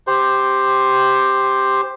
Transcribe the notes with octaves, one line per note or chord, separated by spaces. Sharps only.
G4 C5